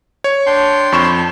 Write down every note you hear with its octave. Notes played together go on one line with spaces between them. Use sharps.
C#5
D4 G5 C6
F2 C#6 E7